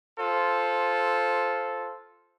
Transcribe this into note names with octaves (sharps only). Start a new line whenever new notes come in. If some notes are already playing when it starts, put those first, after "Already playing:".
F4 A4 C5